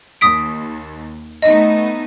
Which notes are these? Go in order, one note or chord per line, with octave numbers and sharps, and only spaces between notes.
D#2 D#6 B6 D7
A3 B3 D#4 D#5